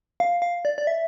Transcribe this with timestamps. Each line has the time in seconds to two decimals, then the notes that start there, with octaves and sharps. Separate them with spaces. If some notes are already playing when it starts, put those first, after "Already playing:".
0.20 F5
0.42 F5
0.65 D5
0.78 D5
0.87 E5